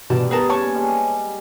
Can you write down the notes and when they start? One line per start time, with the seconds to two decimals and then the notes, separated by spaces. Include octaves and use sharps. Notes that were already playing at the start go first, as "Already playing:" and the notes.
0.10 G2 B2 B4 D5 A5 A#5
0.31 B3 G#4 A#4 A5
0.49 A#2 C#3 C#5 A5 C#6
0.74 G3 G#3